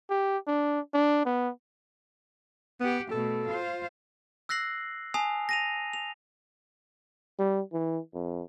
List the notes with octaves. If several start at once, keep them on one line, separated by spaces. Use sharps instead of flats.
G4
D4
D4
B3
B3 G4 F#5
B2 A3 A4
F4 C5
E6 F#6 A#6 C7 F#7
G#5 A5 D#6 C7 F7
A#6 D#7 F7
F7
G3
E3
F2